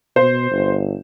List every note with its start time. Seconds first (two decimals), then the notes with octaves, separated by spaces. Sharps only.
0.16 B2 C5
0.51 G1